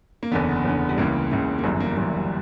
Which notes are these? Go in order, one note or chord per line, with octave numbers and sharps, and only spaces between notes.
A#3
F#1 E2 D3 B3
F#1 E2 D3
G3
C#2 C#3 E3 A#3
C#2 C#3 E3
A#3
G1 F#2 E3 G3
A#3
G3
G1 F#2 E3 A#3
G3